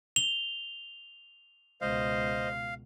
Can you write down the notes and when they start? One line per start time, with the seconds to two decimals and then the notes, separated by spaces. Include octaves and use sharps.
0.16 F7 G7
1.81 C#2 B2 C5 D#5 F5